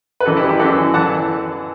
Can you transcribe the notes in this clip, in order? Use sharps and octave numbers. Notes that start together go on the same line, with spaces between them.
B4
F#2 E3 F#4 A4
E4 G4
E4 G4
F#2 E3 F#4 A4
E3 F#5 A5